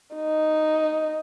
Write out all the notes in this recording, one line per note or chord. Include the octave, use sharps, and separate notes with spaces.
D#4